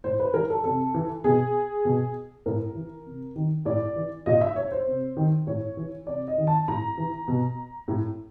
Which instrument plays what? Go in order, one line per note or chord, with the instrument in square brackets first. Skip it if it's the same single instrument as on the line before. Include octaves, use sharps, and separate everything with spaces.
[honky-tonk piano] A2 C5
B4
E3 A#4
A4
C3 A4
E3
B2 G#4
B2
A2 A#4
E3
C3
D#3
A2 D5
E3
A#2 D#5
E5
C#5
C5
C3
D#3
A2 C#5
E3
C3 D5
D#5
D#3
A5
A2 A#5
E3
B2
A2